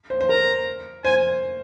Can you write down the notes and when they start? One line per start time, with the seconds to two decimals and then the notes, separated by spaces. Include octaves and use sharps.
0.10 C5
0.21 C5
0.29 A#4 A#5
1.04 C5 G#5